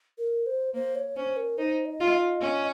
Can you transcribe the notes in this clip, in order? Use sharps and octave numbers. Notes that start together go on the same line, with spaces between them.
A#4
C5
A#3 C5
C#5
C#4 C5
A#4
D#4 C5
D#5
F4
D#5
C#4 D#5